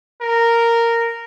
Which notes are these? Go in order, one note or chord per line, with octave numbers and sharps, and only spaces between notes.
A#4